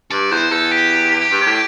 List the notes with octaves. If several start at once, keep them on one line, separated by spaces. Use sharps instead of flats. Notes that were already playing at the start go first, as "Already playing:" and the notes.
G2 D5
E2 C5
E2 A4
G4
G2
C3
A2